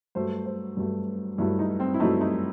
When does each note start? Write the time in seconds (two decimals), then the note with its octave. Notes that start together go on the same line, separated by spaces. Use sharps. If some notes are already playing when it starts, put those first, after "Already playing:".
0.15 G2 F#3 A3 C5
0.46 C5
0.77 G2 F#3 A3
1.38 G2 F#3 A3 E4
1.59 D#4
1.80 C4
1.94 E4
2.00 G2 F#3 A3 D#4
2.21 D#4